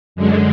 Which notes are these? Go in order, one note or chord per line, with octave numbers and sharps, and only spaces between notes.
F#2 D3 G#3